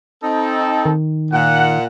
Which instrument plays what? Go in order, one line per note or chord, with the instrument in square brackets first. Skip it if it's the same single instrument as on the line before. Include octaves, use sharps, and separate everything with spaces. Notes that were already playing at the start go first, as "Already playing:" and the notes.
[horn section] C4 D#4 A4
[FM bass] D#3
[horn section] A#2 F#5